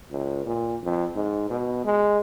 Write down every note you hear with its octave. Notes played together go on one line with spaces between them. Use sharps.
C#2
A#2
F2
G#2
B2
G#3